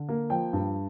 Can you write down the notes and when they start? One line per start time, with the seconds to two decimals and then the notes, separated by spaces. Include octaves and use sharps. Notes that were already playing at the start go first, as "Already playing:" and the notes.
Already playing: D3
0.09 A#3
0.30 F3 G5
0.53 G2